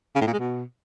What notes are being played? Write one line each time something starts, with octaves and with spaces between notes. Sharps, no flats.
C#3
A2
A#2
G#3
B2